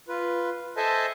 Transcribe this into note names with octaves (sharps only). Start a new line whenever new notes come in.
F4 B4
A4 C5 D#5 E5 G#5 A5